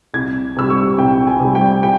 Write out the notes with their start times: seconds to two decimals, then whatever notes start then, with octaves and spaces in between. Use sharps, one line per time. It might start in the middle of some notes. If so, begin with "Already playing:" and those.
0.14 C2 G#6
0.57 C3 G3 E6
0.70 C#6
0.98 C2 G5
1.27 G#5
1.40 C3 G3
1.55 G5
1.83 G5